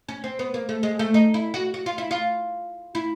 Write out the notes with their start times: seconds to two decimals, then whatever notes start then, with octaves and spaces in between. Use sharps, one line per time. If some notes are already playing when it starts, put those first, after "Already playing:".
0.09 C#4
0.24 C4
0.39 B3
0.54 A#3
0.69 A3
0.83 G#3
0.99 A3
1.14 D#4
1.34 E4
1.54 F#4
1.74 F#4
1.86 F4
1.98 E4
2.11 F4
2.95 E4